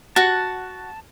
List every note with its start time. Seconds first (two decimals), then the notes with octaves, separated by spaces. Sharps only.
0.16 F#4 F#5 A5